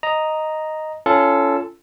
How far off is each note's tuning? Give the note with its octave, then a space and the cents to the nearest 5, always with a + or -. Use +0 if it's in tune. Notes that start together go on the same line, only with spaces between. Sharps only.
D#5 +0 A#5 +0
C#4 +15 F4 -30 A4 +0